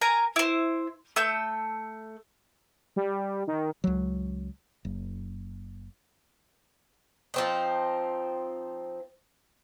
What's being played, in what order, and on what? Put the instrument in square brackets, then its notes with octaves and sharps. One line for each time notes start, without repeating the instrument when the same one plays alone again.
[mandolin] A#4 G#5 A#5
E4 C5
A3 E6 G6
[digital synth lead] G3
D#3
[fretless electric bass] C#2 F#3
F#1
[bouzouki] F3 C4 D#4